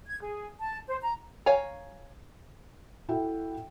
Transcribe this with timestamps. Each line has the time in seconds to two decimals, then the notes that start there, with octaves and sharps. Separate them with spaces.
0.07 G#6
0.21 G#4
0.59 A5
0.87 C5
1.01 A#5
1.46 C#5 F5 G#5 A#5
3.09 E4 F#4 A4 E5 G5